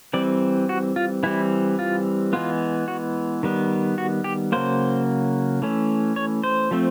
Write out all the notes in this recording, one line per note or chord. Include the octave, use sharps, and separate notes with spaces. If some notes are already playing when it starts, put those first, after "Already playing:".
E3 G3 C4 D5
F#4
F4
E3 G3 C4 E4
F4
E3 G#3 B3 F4
F#4
D#3 G3 B3
F#4
G4
C#3 F#3 A#3 C5
E3 A3 C#4
C#5
C5
F3 A3 C4